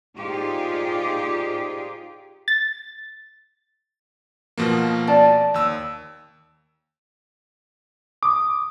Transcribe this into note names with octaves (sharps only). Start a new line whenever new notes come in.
D#4 F4 G4 G#4 C5 D5
A6
B2 F3 A#3
D5 A5
D#2 E6
D6 D#6